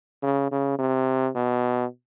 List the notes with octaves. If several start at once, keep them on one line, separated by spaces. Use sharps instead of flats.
C#3
C#3
C3
B2